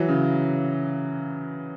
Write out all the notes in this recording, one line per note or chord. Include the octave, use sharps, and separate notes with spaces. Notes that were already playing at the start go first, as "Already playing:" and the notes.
Already playing: E3 F#3
C#3